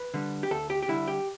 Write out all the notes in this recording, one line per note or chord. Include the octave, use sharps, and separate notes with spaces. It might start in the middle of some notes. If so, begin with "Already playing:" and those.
Already playing: B4
D3 G3
G4
D2 A4
G4
G4
D3 G3 E4
G4